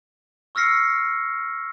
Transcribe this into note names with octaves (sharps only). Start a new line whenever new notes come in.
C#6 E6 F6 A#6 C7 C#7